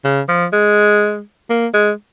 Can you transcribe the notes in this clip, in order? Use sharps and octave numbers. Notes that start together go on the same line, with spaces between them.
C#3
F3
G#3
A#3
G#3